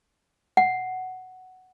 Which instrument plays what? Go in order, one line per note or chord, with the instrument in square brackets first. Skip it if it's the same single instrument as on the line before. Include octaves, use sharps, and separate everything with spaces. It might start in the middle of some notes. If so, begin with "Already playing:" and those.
[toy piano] F#5